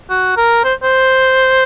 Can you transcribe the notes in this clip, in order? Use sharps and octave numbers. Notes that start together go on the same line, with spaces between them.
F#4
A#4
C5
C5